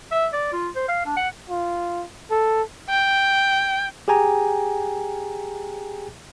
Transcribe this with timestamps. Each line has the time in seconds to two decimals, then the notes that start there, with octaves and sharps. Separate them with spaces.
0.12 E5
0.33 D5
0.53 F4
0.75 C5
0.88 F5
1.06 D4
1.17 F#5
1.49 F4
2.31 A4
2.90 G5
4.08 G4 G#4 G5 G#5 A#5